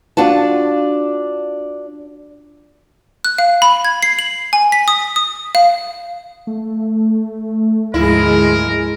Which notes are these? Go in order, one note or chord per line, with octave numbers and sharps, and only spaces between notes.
D4 F4 F#4 A5
F#6
F5
B5
G#6
C7
F#7
G#5
B6
D#6
D#6
F5
A3
D2 G#2 F3 G#3 E4 A#4